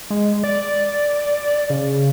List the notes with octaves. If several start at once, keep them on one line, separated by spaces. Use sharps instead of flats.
G#3
D5
C#3